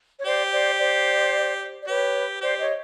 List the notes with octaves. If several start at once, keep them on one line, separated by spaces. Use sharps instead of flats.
C#5
G4 C5 D5
C5 D5
C5 D5
D5
G4 B4 C#5
G4 C5 D5
C#5 D#5